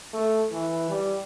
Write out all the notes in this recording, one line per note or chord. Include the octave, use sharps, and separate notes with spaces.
A3
E3
G3